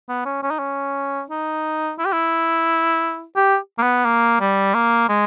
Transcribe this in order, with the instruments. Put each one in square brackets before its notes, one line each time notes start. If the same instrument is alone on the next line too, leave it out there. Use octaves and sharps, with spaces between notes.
[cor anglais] B3
C#4
C#4
D#4
C#4
D#4
E4
G4
E4
G4
A#3
B3
A#3
G3
A#3
G#3